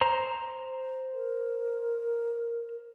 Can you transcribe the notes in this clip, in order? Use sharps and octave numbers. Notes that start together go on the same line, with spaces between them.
C5 A#5
A#4